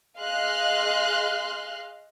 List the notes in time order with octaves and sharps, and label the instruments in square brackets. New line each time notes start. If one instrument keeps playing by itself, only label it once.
[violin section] G#4 D#5 F5 C6 F6 F#6